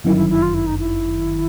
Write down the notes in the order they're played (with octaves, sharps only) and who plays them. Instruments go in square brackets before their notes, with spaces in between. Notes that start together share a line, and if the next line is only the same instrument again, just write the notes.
[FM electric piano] G1 F#2 D#3 [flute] E4
[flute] E4
E4
F4
E4
D#4
E4